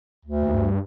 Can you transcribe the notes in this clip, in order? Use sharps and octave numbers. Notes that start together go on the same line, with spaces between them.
D2
D#2
G2